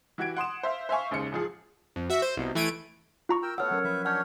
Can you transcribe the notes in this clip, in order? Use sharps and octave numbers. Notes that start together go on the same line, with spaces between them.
E3 F#4 G4 G#6 D7
F#5 C6 D#6 E7
C5 E5 F5
C5 E5 F5 G#5 C#6
D#2 C#3 G#3 C5 C#7
A1 F3 G#4
F2
F#4 E5
C5
C2 B2
E3 A3 G#6 D7 D#7
F4 A#5 C#6
A#4 G5 E6
A3 B3 C#5 F#5 E6 F6
F#3 C#4 A#4
F3 B4 E5
C#4 D4 C#5 F#5 F6 G6